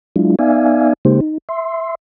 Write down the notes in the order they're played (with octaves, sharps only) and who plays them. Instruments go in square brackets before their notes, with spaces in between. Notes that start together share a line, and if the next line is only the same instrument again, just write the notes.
[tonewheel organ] F#3 G#3 D4 E4 F4
B3 D#4 D5 E5 F5 G#5
C#3 G#3 A#3 D#4 G4 C5
D#4
E5 C6